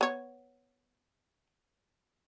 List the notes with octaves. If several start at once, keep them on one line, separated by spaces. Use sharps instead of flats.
B3 C#5